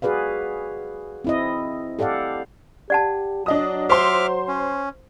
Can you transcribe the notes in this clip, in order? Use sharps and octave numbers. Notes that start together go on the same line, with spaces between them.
F#4 G#4 B4 D5 F5
C4 E4 D#5
G4 A4 D5 F5 F#5
G4 D5 F#5 A5
F#3 D4 D#5 D#6
C5 E5 C6 D6 F6
C#4